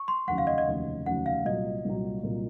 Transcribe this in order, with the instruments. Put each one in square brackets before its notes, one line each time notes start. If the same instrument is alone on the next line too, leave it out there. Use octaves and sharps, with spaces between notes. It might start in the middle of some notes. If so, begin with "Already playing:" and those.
Already playing: [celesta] C#6
C6
[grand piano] F1 D#2 C#3 F#3 [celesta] F#5
[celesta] F5
D#5
D#5
[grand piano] F1 D#2 C#3 F#3
[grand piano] F1 D#2 C#3 F#3 [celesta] F#5
[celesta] F5
[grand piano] C2 A#2 F#3 [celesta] D#5
[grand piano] C2 A#2 F#3
C2 A#2 F#3